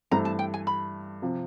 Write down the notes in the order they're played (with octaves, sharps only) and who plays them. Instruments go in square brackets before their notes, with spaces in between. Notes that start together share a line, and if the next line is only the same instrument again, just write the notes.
[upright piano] G2 E3 A3 C4 E4 [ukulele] A#5
[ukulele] A5
G5
G#5
B5
[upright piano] C3 F3